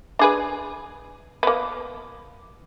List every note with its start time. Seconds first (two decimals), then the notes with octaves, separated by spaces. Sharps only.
0.19 D4 G#4 B4
1.43 A#3 B3